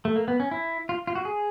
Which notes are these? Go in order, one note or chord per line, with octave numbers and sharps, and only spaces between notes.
A3
A#3
B3
C#4
E4
F4
F4
F#4
G#4